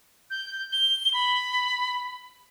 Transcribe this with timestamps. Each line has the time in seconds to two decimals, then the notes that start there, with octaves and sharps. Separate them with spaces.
0.30 G6
0.72 G7
1.14 B5